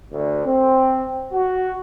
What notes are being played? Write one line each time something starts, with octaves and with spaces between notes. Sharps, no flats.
D2
C4
F#4